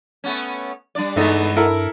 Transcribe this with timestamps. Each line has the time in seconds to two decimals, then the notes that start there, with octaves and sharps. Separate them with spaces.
0.24 A3 B3 C#4
0.95 G3 D4 D5
1.16 G2 E3 G#3 A3 B3 D#4
1.57 E4 A4 A#4